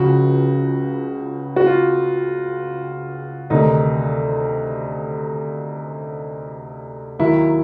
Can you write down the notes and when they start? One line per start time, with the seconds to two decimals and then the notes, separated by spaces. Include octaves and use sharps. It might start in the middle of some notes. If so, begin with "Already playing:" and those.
Already playing: C#2 C#3 F3 F#4
1.56 F#4
1.66 F4
3.50 D2 C3 D#3 D#4
7.19 D#2 D#3 F#3 E4